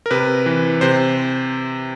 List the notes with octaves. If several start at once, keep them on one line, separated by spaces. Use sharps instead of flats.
A#4
C3 B4
E3
C3 C5